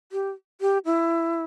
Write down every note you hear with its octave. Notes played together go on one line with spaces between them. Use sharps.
G4
G4
E4